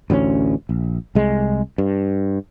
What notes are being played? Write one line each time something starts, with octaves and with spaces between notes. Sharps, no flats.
A1 D2 F#3 C#4
A#1
C2 G#3
G2